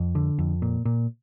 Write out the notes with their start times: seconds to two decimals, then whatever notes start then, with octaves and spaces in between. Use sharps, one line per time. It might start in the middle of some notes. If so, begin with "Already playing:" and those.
Already playing: F2
0.15 D3
0.39 F2
0.62 A#2
0.85 A#2